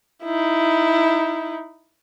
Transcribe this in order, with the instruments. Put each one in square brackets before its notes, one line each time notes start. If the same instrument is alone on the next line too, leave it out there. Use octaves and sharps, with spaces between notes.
[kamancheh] D#4 E4